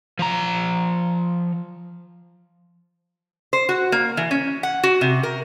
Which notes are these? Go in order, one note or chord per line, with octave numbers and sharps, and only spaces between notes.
F3 A#5
C5
F#4
A#3
E3
C#4
F#5
F#4
C3
A#4